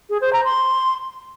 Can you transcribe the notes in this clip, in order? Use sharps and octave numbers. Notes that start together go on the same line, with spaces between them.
G#4
C5
A#5
C6